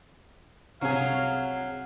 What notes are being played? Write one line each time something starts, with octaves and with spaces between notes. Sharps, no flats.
C2 C3 F#3 G#4 F5